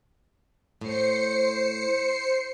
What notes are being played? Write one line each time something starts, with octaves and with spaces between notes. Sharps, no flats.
A2 C5 C7 C#7